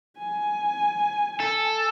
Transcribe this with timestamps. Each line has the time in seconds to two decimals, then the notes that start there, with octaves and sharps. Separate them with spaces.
0.18 G#5
1.40 A4